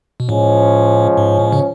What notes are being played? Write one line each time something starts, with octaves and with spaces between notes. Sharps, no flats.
B2
A2 F3 G#3 C#4
G#2
A2
C#3